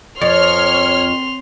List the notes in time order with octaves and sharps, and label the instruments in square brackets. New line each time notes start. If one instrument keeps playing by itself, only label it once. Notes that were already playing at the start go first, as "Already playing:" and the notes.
[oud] F2 [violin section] C#5 F6 [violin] C6 F7